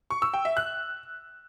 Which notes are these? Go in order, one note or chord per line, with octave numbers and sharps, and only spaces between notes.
C#6
E6
G5
E5
F#6